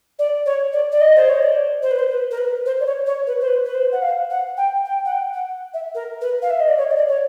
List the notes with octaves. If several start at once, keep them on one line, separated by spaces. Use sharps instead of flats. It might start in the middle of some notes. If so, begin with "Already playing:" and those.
D5
C#5
D5
D5
D#5
C5
C#5
D5
C5
B4
C5
B4
A#4
B4
C5
D5
C#5
C#5
B4
C5
B4
B4
C5
F#5
F5
F#5
G5
G5
F#5
G5
F#5
E5
A#4
B4
F5
E5
D#5
D5
C#5
D#5
D5
C#5